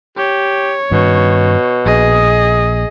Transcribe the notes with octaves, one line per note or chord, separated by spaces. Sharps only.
G4 C#5
G2 B2 D#3 C#4
A#1 G#4 D#5